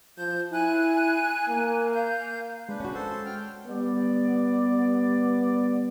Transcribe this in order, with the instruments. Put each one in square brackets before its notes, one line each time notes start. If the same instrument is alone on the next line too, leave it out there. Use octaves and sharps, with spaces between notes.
[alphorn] F3 [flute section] G6
[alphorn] E4 [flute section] G#5 F#6
[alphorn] A#3
[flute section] F5 G6
[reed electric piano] G#3 [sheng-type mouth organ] D4 B4
[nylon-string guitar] C#4 F#4
[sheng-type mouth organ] A4 C5
G5 F6
[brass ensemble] G3 B3 D5